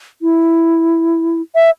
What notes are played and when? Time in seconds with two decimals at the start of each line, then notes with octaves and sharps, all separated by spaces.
0.22 E4
1.55 E5